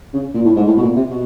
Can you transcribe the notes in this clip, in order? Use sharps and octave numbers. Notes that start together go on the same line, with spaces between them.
C#3
A#2
A2
G#2
A2
B2
A#2
C3
B2